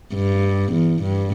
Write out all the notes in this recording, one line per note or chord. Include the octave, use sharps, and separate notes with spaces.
G2
E2
G2